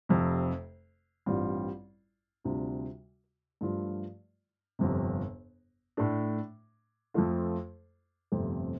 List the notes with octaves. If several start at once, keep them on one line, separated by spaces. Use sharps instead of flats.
F1 F2 C3
A1 G2 G3 C4 F4
D2 C3 G3 D4 F4
G2 F3 A3 F4
G1 F2 C3
A2 A3 D4
F2 F3 A3 F4
G1 F2 C3 A3 C4